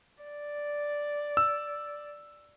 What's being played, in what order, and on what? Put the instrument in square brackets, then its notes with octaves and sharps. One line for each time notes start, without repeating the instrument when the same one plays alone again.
[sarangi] D5
[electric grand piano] E6